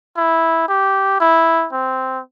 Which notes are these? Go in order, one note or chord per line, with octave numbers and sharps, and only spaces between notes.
E4
G4
E4
C4